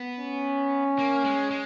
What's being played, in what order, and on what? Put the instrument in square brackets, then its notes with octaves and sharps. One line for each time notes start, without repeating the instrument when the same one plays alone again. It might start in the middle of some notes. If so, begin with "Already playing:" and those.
Already playing: [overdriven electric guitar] B3
[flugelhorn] C#4
[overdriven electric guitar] A#3
G#3
G#3